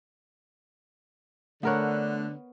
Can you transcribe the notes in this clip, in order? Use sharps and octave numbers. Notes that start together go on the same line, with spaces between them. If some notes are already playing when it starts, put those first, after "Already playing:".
D3 A3 B3 A#4 C#5 F#6